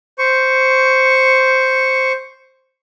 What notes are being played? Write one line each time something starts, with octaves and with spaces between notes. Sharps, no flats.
C5 C#6